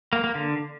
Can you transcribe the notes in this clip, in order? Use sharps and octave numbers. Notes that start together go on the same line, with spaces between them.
A#3
A#3
D3